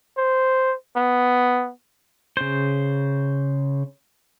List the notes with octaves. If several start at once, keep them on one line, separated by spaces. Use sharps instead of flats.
C5
B3
C#3 C5